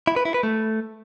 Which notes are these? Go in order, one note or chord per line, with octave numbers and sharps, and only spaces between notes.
E4
B4
E4
B4
A3